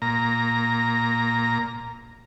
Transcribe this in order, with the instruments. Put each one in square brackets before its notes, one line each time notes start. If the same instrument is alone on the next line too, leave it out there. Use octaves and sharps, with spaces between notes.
[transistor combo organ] A#2 A#5